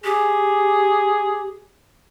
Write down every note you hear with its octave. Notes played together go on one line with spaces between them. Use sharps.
G4 G#4